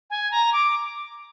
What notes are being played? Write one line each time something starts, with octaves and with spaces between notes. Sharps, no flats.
G#5
A#5
D6